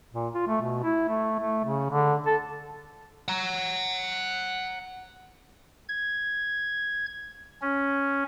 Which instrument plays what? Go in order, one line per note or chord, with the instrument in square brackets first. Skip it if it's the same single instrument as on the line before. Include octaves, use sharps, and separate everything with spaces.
[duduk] A#2
F4
A3
B2
E4
A3
A3
C#3
D3
A4
[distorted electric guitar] F#5 A#5
[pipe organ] G#6
C#4